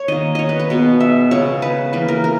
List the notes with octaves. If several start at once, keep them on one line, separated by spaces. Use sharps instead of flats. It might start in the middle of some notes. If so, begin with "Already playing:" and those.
Already playing: C#5
D#3 A#3 D#5
C#5 D#5
B4
B4
B2 G#3 B3
E5
C#3 G#3 B3 C#5
B4
E3 A#3 B4
A#4
A#4